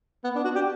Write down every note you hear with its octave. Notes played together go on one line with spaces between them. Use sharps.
B3
D4
F#4
G4